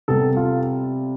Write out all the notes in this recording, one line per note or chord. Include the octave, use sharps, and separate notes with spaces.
C3 G3 B3 A4
F4